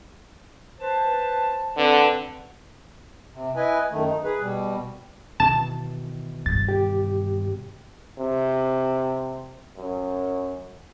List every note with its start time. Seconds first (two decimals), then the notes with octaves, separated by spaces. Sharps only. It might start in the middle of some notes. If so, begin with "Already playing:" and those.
0.80 B4 C5 A5
1.77 D3 C4 B4
3.32 C3
3.56 E4 B4 D#5 G#5
3.91 F#2 D#3 A3
4.04 D#4
4.24 G#4 B4
4.41 B2 G3
5.40 B2 D#3 E3 A5
6.46 G2 A6
6.69 G4
8.18 C3
9.77 F#2